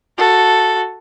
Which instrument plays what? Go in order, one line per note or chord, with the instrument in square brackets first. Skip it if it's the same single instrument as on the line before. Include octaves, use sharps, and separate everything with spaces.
[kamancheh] F#4 A4